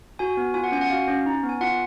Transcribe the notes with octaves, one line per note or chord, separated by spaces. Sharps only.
F#4 G#5
B3
F4 G#5
F#5
C#4 G#5
F#5
F#4 F5
C#4
D#4
B3
G#5
F4 F#5